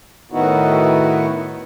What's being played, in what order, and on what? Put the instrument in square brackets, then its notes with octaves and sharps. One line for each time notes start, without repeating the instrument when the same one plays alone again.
[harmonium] A2 D#3 B3 D#4 E4 F#4